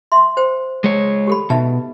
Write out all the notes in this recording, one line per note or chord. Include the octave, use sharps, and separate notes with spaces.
E5 C6
C5 G5
G#3 C#5
G4 A4 B5
B2 D#4 E5 A5